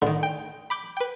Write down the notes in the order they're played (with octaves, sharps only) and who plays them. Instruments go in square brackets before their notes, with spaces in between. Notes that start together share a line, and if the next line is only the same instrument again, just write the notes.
[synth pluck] A2 D#3 [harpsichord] D3
[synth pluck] G5
B5 D6 G6
B4 G5